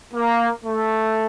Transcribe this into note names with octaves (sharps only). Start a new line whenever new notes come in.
A#3
A3